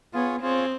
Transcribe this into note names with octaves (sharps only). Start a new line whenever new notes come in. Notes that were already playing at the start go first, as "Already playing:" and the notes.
B3 F4 G#4 C#5
C4 F4 G#4 C#5